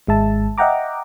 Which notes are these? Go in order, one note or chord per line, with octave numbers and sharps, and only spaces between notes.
G#1 G#3 E5 A5
D#5 E5 F#5 G5 A#5 D6